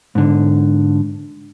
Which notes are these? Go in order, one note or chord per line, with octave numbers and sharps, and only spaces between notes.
G#2 D3